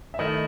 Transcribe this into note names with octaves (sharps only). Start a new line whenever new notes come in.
E5
D#3 A3 E4 D#5